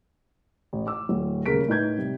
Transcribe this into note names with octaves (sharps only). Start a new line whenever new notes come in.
A1
D6 E6
D1
D#1 C#3 G#4 A#4 B6 D7
A2 D#4 B4 G6 G#6
C3 G3